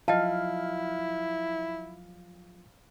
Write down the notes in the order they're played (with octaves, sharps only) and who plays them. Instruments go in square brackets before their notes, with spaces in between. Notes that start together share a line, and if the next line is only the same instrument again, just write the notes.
[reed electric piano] F3 F#3 F4 [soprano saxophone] E4 [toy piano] D#5 G5 A5 [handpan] F5